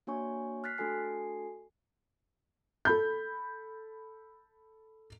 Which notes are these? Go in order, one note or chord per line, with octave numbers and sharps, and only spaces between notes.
A#3 D4 F#4 C#5 G#5 C#6
F6 F#6 A6 B6 C7
A3 D4 F#4 A4 G#5 C7
A4 B5 G6